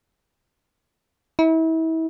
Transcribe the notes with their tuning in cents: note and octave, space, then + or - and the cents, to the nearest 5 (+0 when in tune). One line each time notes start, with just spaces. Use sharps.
E4 -35